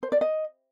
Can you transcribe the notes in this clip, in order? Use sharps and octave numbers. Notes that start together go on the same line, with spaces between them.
C5
D5
D#5